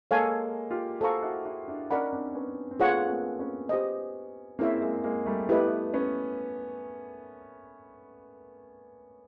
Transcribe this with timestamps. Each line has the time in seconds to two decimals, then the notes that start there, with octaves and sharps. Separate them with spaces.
0.11 G#3 A#3 A4 C#5 F5 G#5
0.71 F4 G4
1.01 F#4 G#4 A4 C5 F5 A#5 C#6
1.23 E4 F#4
1.45 E4 F#4
1.68 D4 E4
1.91 C#4 D#4 A#4 D5 F#5 B5
2.13 C4 D4
2.35 B3 C#4
2.71 C4
2.79 A3 B3 F4 G#4 C#5 F#5
3.09 A#3 C4
3.39 B3 C#4
3.69 G4 C5 D#5
4.59 A#3 C4 C#4 E4 G#4 C#5 E5
4.82 G#3 A#3
5.04 G#3 A#3
5.26 G3 A3
5.49 A3 B3 E4 G4 B4 D#5
5.94 B3 C#4